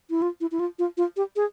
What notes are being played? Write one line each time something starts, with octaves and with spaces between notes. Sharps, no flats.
E4
F4
E4
E4
F4
F4
F4
G4
G#4